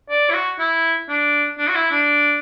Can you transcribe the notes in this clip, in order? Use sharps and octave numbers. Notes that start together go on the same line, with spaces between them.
D5
E4
F#4
E4
D4
D4
F#4
E4
D4